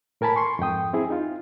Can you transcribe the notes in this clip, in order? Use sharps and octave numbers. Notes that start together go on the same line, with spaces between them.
A2 A#4 G#5 A5 B5
C6 C#6
F2 G#2 G5 D#6
C4 E4 G#4
D#4 F4